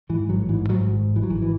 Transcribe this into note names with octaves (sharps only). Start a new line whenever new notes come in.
G#2 E3
A1 F#3
G#2 E3
G#2 F#3
G#1
G#1
E3
F#3
G#1 E3
E3